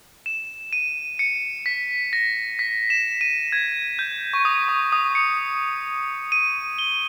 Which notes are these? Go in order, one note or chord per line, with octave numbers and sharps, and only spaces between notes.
E7
D#7
C#7
B6
A#6
B6
E7
D#7
G#6
G6
C#6
D#6
C#6
D#6
C#7
D#7
G7